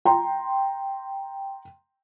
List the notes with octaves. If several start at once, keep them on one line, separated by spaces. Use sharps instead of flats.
G5 A#5 C6